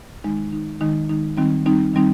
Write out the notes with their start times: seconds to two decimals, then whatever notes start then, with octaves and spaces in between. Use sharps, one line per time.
0.24 D#3 G#3 D#4
0.52 D#3 G#3 D#4
0.81 D#3 G#3 D#4
1.10 D#3 G#3 D#4
1.37 D#3 G3 C4 D#4
1.65 D#3 G3 C4 D#4
1.94 D#3 G3 C4 D#4